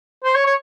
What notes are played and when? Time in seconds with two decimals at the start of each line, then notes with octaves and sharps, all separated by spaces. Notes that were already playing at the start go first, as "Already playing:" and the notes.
0.24 C5
0.35 C#5
0.46 C#5